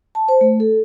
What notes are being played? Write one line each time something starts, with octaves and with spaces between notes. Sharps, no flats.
A5
C5
A3
A4